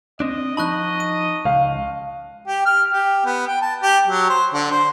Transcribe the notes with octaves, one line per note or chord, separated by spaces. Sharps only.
C4 D4 D#5
F3 D#4 D#5 A5 B5 C#6 F#6
D#7
C#2 F5
G4
F6
G4
B3
G5
A5
G4
F#3
C5
D3
C5